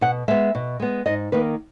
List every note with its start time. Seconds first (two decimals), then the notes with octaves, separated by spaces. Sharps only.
0.01 B2 F#5
0.28 G#3 B3 E5
0.55 B2
0.80 G#3 B3
1.06 G#2 D#5
1.32 D#3 A#3 B4